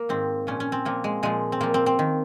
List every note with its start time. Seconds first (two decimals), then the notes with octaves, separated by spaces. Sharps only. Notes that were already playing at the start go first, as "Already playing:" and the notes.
Already playing: A#3
0.09 G#2 D#3 C4
0.47 A#2 F3 C#4
0.60 C#4
0.72 C4
0.85 A#2 F3 A#3
1.04 G#3
1.23 A#2 F3 G#3
1.52 C4
1.61 A#2 F3 A#3
1.74 C4
1.86 C4
1.99 D#3